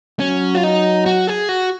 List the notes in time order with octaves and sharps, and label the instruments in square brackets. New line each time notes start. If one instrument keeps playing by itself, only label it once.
[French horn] F#3 [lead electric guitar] C#4
[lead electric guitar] F4
D#4
F#4
G#4
F#4